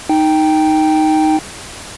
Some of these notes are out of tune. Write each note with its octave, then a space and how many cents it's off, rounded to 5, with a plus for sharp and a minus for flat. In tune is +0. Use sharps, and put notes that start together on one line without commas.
D#4 +0 G5 +0